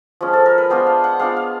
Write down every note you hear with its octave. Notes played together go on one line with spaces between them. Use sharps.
F3 G#3 C#4
A4
A#4
B4
G#3 B3 D4 F4 C5
F5
F#5
G#3 B3 D4 F4 F5
F5